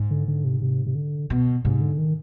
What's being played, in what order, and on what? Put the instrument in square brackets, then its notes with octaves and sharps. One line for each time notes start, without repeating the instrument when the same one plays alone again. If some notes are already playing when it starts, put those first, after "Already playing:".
Already playing: [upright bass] G#2
[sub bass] D3
D3
C3
C3
C3
D3
[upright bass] B2
[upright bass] G#2 [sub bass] C3
[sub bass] D3
D#3